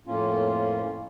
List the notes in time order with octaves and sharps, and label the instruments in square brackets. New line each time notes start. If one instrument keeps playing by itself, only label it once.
[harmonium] F2 A2 A#3 C#4 F4